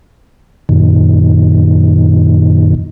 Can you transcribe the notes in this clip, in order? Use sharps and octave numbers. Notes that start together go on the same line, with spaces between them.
F#2 A#2 D#3